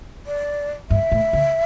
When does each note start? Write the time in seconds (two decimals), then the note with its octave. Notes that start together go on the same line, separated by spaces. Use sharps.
0.27 D5
0.90 G2 E5
1.12 A2
1.33 D3